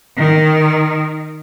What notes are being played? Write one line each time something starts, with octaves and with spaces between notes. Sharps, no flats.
D#3